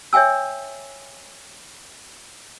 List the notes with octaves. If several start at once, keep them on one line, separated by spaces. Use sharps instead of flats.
C#5 E5 G5 G#5 E6